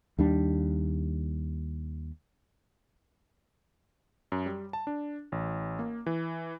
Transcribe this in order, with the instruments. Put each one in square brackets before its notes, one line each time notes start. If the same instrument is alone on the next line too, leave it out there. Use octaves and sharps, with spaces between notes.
[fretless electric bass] D#2 G3 D4
[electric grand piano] F#2
G3
A5
D4
A1
A#3
E3